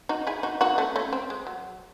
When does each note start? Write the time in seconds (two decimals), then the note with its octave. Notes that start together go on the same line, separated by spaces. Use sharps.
0.09 D#4 F#4
0.27 E4 G#4
0.43 D#4 F#4
0.61 D#4 F#4
0.78 A3 C#4
0.96 A3 C#4
1.13 C4
1.30 G#3
1.47 F#3